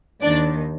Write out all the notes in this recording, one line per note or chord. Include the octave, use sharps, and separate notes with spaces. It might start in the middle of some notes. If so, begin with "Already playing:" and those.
D#2 D#3 D4 D5